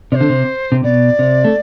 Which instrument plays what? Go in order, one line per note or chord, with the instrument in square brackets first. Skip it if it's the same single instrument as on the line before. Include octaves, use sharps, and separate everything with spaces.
[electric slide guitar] C3 [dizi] C5 D5
[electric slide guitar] D3
C3
C3
[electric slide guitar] B2 [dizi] D5
[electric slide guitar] C3
A3